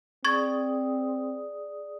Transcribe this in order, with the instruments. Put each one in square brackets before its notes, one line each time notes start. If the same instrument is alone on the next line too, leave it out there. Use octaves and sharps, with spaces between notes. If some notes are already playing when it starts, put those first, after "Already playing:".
[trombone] C4 [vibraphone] G#4 D5 D#6 [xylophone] C#6 G#6 A6